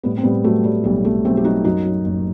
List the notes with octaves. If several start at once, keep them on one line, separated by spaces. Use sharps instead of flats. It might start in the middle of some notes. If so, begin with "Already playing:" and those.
A2 G3 B3
C4
A2 G3 B3
F#3 A3
F#3 G3
B1 G3
B1 A3
B1 A3 C4
G4
F#3 D#4 F#4
F#2 D#4 F#4
F#3
F#1